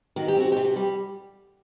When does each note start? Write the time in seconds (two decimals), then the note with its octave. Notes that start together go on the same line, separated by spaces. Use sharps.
0.16 D#3 F#4
0.28 G4
0.36 C4 F#4
0.52 C3 G4
0.65 F#4
0.76 G3 G4